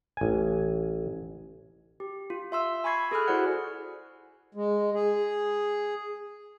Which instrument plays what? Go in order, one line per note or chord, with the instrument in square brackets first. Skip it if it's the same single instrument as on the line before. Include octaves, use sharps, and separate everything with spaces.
[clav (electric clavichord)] A1 G#5
[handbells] G4
F4
E5 C6 E6
G#5 B5 C#6 G#6 C7
G#4 A4 G#5 B5 F6 F#6
E4 F#4 C5 D5 F#5
[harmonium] G#3
G#4